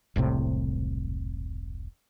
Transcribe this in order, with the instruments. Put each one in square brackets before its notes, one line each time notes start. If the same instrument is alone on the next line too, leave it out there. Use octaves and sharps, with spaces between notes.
[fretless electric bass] E1 C2 A2 C3